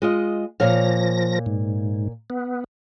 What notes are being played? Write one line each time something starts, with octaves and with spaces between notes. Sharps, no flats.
G#3 F4 D#5
A#2 F3 C#5 F5 A#6
G#2
B3